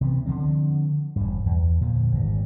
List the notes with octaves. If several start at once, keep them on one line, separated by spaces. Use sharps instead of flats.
C3 E3 B3
D3 D#3 F3 C4
E1 G2
E2
A#2 D3 F3
G#1 G2